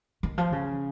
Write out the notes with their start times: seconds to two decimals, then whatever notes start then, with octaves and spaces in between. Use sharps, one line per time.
0.23 D#3
0.38 F3
0.52 C#3